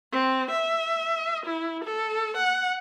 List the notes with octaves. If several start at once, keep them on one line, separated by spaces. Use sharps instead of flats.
C4
E5
E4
A4
F#5